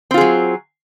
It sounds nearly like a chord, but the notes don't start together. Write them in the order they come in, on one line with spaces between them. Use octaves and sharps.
C4 F4 G#4 F#3